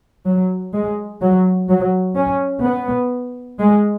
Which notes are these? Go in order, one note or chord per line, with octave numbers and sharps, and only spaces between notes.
F#3
G#3
F#3
F#3
C#4
B3
G#3